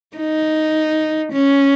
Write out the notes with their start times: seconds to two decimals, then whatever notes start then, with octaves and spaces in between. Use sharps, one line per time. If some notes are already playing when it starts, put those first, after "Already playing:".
0.17 D#4
1.33 C#4